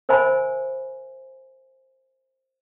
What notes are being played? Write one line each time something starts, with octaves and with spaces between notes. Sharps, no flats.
A#4 C5 E5 G#5 B5